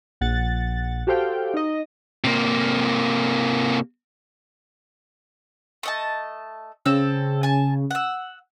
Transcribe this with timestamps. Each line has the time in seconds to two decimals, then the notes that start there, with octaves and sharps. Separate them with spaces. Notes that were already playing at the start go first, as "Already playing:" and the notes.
0.21 A#1 F#5 A6
1.07 F#4 G4 A4 C5 F5 G5
1.54 D#4 D#5
2.24 C3 A#3
5.83 A3 D#5 A5
6.86 C#3 C4 A4 E6
7.43 G#5 A5
7.91 F#5 E6